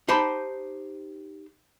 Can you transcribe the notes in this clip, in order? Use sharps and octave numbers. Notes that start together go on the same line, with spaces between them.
D#4 G4 C5 A5 B5